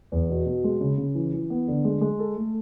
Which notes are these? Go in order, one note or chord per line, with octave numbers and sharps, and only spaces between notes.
E2
B2
B2
G#3
C#3
C#3
E3
E3
B3
D3
G#3
G#3
A4
A3